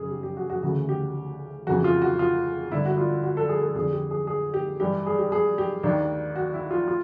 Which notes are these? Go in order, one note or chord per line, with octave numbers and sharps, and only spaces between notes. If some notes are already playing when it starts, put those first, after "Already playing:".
Already playing: F#2 C#3 G#4
G4
G4
F#4
F#4
D2 C#3 E3 F#4
G4
F2 C#3 E3 F#4
F4
F#4
F4
G2 D3 E4
F#4
F4
F#4
A4
G#4
A4
F2 D3 G#4
G4
G#4
G#4
G4
G2 E3 G4
G#4
G4
G#4
G4
D#2 D#3 D4
F#4
E4
F4
F4